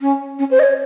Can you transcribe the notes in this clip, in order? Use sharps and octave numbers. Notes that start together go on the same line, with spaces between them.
C#4
C#4
C5
D#5
C#5